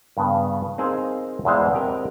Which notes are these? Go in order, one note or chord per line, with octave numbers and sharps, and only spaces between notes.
G2 C#3 B3
C4 D#4 G#4 A#4 C5 F5
E2 E3 G#3 C5 F5
C4 G4 A#4 D#5